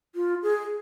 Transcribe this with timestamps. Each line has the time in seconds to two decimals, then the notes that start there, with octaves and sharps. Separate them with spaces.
0.15 F4
0.43 G#4